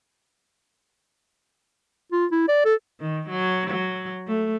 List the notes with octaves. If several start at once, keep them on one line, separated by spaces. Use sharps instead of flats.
F4
E4
D5
A4
D#3
F#3
F#3
A3